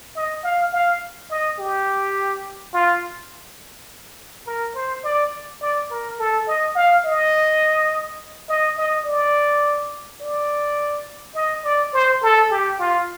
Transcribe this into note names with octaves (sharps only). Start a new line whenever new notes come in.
D#5
F5
F5
D#5
G4
F4
A#4
C5
D5
D5
A#4
A4
D#5
F5
D#5
D#5
D#5
D5
D5
D#5
D5
C5
A4
G4
F4